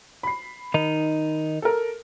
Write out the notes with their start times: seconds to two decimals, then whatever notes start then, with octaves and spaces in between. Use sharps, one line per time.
0.23 B5 C7
0.74 D#3 D#4
1.62 A4 A#4